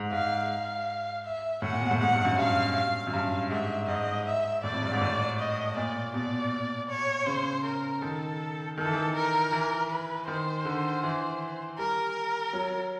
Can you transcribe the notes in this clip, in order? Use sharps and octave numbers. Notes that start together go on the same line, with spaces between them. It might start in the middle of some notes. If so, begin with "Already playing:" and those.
Already playing: G#2
G#2 F5
F5
E5
A2 F#5
A#2
B2
A2
G#2 F#5
G2
F#2
G2 F5
F5
F#2
G2 F5
G#2 E5
G#2 D#5
E5
A2 D5
F2
G2
G#2
A2
D#5
A#2 D5
B2 D5
C#5
C#3 C5
A#4
D#3 A4
D#3 A4
E3
D#3
A#4
E3
B4
D#3 C5
D3
E3
G3 A#4
F#3